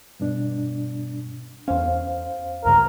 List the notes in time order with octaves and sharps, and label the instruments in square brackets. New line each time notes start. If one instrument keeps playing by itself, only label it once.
[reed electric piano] G2 B2 D4
[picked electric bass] E2 C#4 [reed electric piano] C5 F5
[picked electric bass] C#2 G2 C#3 [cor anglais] A#4